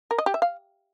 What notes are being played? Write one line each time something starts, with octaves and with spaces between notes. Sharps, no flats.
A#4
D#5
G4
E5
F5